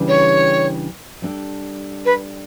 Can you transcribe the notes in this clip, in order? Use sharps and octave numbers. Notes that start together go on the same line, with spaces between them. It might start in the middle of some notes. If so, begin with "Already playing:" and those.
Already playing: C#3 E3 G3 D4 G4
C#5
G3 D4 A4
B4